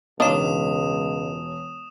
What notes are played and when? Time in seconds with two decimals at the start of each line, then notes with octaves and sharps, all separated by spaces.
0.20 E1 C#2 D4 D#4 F4 C#5 D#6 E7